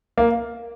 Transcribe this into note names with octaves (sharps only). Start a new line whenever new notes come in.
A#3